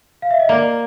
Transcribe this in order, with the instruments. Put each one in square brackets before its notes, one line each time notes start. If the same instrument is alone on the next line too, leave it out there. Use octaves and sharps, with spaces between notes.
[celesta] F5
E5
D#5
[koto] A#3 [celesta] D5